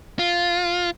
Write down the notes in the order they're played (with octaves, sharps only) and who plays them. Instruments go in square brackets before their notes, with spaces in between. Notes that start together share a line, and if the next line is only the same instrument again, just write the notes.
[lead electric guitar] F4